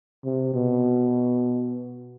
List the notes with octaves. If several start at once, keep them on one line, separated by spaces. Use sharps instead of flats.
C3
B2